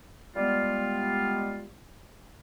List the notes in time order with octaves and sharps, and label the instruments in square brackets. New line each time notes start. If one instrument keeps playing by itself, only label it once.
[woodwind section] G3 G#3 B3 F4